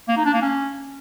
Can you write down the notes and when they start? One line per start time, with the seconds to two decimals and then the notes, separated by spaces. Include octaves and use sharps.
0.08 A#3
0.17 D#4
0.25 D4
0.34 A#3
0.42 C#4